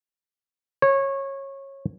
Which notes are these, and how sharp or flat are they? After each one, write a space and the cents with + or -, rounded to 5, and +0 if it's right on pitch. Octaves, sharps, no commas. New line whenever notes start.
C#5 -20